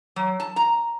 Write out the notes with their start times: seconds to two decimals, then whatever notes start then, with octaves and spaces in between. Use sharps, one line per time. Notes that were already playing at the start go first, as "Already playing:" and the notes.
0.16 F#3
0.40 A5
0.56 A#5